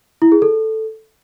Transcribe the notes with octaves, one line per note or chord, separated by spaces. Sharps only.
E4
G#4
A4